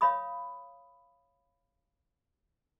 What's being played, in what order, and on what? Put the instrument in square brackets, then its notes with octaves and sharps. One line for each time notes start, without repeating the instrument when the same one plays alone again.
[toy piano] C#5 F5 B5 D#6